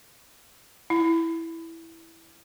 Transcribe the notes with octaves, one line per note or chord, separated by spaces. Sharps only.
E4